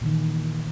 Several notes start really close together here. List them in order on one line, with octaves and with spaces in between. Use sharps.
A#2 E3 D#3